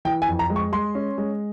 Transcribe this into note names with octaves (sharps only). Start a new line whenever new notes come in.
E3 G5
G#5
F2
A#5
G#3
C#6
G#3 C6
C#4
G#3